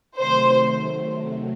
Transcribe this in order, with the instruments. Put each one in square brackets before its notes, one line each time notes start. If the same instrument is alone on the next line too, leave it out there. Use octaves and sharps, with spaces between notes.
[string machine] C3 D#3 F#3 A3 [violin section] C5